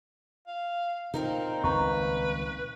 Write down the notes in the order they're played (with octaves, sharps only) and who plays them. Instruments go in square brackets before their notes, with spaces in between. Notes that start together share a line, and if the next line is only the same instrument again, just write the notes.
[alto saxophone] F5
[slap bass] A#2 [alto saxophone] C4 [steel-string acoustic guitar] D#4 A#4 F5
[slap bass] D#1 C#2 C4 [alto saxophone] B4 [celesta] A#5 C#6